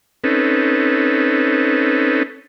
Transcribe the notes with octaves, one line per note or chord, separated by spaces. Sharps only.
C4 C#4 D#4 A4 B4